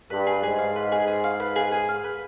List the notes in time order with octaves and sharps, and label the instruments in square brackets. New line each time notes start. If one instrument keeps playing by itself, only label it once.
[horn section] G2 [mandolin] B4
[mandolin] G#4
[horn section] G#2 [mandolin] G#4
[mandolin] F5
B4
G#4
G#4
F5
B4
G#4
G#4
F5
B4